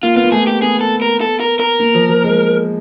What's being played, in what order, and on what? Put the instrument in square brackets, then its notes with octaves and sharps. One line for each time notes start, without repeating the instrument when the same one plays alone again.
[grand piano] A#3 [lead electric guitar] F4
[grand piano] B3 [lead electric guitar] F4
[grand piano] A#3
[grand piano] A3 [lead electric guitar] G#4
[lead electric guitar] G4
[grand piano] B3 [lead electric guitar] G#4
[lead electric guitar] A4
A#4
A4
A#4
A#4
[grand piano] A#3
F3
F3
G#3